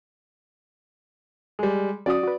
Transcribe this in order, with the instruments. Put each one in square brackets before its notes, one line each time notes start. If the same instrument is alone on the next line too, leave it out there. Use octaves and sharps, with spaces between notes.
[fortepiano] G3 G#3
[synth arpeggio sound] F#3 C#4 F#4 [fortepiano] D5 D#6
[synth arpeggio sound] F#4 B4